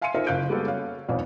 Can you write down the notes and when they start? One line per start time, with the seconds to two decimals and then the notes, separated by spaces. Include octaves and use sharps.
0.01 E5 F5 G#5 C6 C#7 D#7
0.14 D#4 F4 A#4 C5 D#5 E5
0.26 F#1 F5 F#6 G6 D7
0.49 G3 G#3 A#3 B3 F#4 A4
0.66 C#4 F5
1.08 E1 B1 F2 A#2 B3 C#5